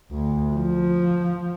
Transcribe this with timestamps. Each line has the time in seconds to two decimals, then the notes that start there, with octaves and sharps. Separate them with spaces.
0.11 D2
0.54 F3